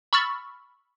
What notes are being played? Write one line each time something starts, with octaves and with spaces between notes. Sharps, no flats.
B5 C#6 E6 F6 A6